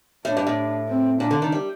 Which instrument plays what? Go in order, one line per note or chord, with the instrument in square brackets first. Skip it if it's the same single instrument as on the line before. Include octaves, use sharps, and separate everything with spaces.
[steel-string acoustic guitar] A2 [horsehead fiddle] D4
[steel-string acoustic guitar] G2
A2
[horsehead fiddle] C4
[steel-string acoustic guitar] A#2 [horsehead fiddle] D4
[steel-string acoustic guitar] D3
D#3
G3